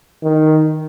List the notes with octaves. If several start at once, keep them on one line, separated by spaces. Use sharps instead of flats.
D#3